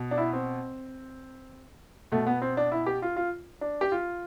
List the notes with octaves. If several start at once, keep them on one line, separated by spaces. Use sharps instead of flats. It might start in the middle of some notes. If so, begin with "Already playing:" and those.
Already playing: B2
D4
E4
C4
B2 A3
B3
C4
D4
E4
G4
F4
F4
D4
G4
F4